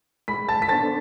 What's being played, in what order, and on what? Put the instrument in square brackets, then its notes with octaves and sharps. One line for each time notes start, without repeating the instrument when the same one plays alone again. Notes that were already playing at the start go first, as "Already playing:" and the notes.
[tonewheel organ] G#3 [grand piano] B5 B6
[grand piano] A5 A6
B6
[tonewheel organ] B3 D4 A4 C5 [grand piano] A5 A6